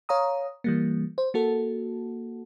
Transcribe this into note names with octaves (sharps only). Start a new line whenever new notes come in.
C#5 F5 A#5 D#6
E3 G3 A#3
C5
A#3 F#4 A4